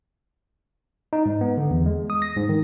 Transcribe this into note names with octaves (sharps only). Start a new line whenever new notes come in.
D#4
G#2
B3
D3
E2
G#3
D#6
A#6
G#2
D#3